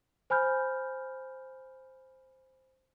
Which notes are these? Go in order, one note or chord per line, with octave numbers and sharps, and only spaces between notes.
C5 G#5 B5 F6 G6